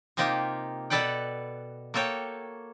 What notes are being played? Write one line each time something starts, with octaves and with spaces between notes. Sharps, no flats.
C3 A#3 D#4 F4 G4
B2 A4 B4 D5 F#5 G5
A#3 F#4 A4 C#5 G5